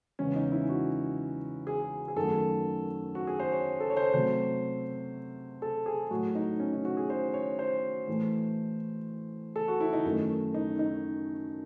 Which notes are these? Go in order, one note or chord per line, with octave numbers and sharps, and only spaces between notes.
E2 C#3 G#3 C#4
D#4
E4
F#4
G#4
G#4
F#2 D#3 F#3 A3 A4
F#4
G#4
C5
C#5
A4
C#5
C5
C3 F#3 A3 C5
A4
G#4
A2 F#3 A3 F#4
D#4
C#4
D#4
F#4
G#4
C5
C#5
C5
A2 E3 A3
A4
F#4
E4
D#4
F#2 D#3 A3
D#4
D#4